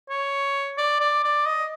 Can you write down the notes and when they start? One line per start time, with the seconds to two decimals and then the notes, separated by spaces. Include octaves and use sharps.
0.10 C#5
0.78 D5
1.00 D5
1.24 D5
1.46 D#5